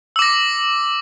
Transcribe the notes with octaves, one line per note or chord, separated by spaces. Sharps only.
D6 E6 A#6